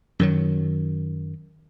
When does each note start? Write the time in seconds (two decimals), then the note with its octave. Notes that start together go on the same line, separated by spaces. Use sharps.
0.19 F#2 D#3 F#3